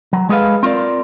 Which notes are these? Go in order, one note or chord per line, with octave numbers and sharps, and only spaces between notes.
F#3
G#3 G#4 A4 B4 F5
C4 F4 A#4 D5